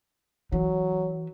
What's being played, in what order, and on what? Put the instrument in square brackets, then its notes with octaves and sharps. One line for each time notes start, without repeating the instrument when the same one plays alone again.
[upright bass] E3 [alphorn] F#3